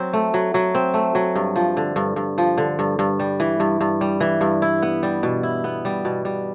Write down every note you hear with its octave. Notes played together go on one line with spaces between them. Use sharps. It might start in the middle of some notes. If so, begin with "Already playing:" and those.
Already playing: F#3 C4
A3
F#3
F#3
C4
A3
F#3
G2
F3
D3
G2
G2
F3
D3
G2
G2
G3
E3
G2
G2
G3
E3
G2
E4
B3
G3
B2
E4
B3
G3
B2
G3